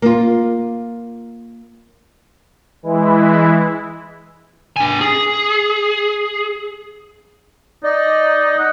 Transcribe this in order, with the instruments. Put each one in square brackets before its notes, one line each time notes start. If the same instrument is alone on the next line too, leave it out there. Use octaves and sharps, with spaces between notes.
[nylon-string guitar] A#3 F4
[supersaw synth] E3 G#3 E4
[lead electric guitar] D4 G#5
G#4
[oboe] D#4 [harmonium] D5 D#5
[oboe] F#5